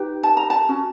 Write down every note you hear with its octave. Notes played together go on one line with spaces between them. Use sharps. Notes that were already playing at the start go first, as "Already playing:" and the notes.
Already playing: D#4 G4 B4
A5
A#5
A5
C#4 F#4